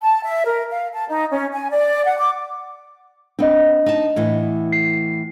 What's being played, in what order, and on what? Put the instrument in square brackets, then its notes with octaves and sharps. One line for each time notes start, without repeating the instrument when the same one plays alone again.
[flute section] A5
E5
A#4
F5
A5
D#4
C#4
G#5
D5
F#5
D6
[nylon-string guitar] B3 C4 [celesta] D4 D#5
[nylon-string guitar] D#4 A5
A2 E3 B3
[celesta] C7